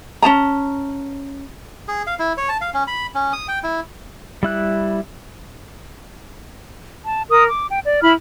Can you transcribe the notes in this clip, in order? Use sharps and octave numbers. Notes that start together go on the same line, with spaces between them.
C#4 D4 A5 A#5
G#4
F5
E4
C#5
A5
F5
C#4
B5
C#4
D#6
G5
E4
G3 E4 F#6
A5
A#4 D#6
D6
G5
D5
E4 B5 F6